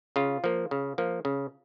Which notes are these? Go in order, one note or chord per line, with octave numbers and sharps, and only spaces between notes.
C#3 F4
F3 A#3
C#3
F3 A#3
C#3